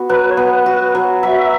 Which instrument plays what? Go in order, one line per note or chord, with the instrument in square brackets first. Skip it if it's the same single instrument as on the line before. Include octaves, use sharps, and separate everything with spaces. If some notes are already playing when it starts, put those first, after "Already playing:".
Already playing: [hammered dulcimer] B3 F#4
[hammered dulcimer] F#3 [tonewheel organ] B4
[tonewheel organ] C#5
[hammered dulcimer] B3 [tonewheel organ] B4
[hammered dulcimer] F#4
F#3
[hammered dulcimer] F#3 [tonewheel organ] E5